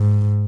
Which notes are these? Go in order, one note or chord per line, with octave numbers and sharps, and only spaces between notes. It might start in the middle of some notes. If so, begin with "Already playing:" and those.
Already playing: G#2